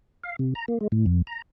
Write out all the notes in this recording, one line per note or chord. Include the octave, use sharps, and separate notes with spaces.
F5
C3
A#5
A#3
G#3
A2
F2
A#5